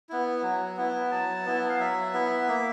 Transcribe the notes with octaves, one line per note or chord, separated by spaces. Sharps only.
B3 E4
F#3
B3 E4
F#3 A5
B3 E4
F5
F#3 E5
B3 E4
A#3